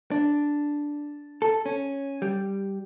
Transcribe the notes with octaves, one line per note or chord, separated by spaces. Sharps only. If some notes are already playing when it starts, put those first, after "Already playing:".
D4
A4
C#4
G3